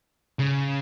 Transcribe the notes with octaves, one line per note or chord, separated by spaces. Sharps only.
C#3